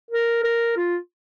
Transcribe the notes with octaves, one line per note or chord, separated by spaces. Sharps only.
A#4
A#4
F4